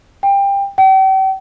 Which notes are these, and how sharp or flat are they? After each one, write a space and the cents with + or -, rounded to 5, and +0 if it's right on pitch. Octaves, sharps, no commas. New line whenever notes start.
G5 +20
G5 -40